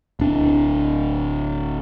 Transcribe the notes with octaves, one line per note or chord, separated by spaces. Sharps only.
D1 D4